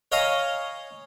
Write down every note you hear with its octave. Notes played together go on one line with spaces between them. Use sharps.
C#5 D#5 F5 G#5 A#5